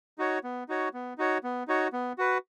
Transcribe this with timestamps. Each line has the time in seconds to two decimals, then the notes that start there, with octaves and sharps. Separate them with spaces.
0.18 D#4 F#4 C#5
0.44 B3
0.68 D#4 F#4 C#5
0.94 B3
1.18 D#4 F#4 C#5
1.44 B3
1.68 D#4 F#4 C#5
1.93 B3
2.18 F#4 B4